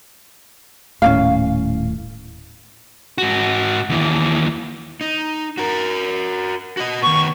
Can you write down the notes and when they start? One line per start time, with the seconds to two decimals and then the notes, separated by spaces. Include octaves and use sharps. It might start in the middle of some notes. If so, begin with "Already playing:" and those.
1.02 D#1 A2 C#4 D4 F5
3.18 G#2 F#4
3.89 D#2 E3
5.01 D#4
5.58 F#4 A#4
6.77 F#4 D#5
7.02 D#3 B3 C#6